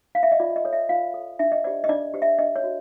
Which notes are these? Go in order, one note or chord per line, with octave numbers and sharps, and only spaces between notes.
F5
E5
D#5
F4 D5
D#5
A4 C#5
E5
F4 F5
A4 C#5
D4 E5
D#5
G4 C5 D5
D#5
D4 D5
G4 C5
E5
D4 D#5
C#5
F#4